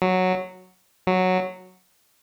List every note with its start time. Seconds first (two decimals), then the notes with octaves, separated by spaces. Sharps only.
0.02 F#3
1.07 F#3